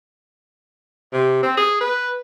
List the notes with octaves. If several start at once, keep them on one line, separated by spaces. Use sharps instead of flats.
C3
C4
G#4
B4